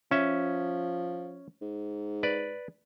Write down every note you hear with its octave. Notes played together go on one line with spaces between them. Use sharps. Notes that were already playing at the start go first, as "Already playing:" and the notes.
F3 C#4 E5
G#2
B4 D5